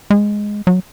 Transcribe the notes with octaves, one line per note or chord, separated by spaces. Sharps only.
G#3
F#3